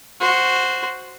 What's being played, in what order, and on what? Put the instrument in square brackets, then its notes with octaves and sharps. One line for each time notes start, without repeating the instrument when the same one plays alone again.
[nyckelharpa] F#4 C5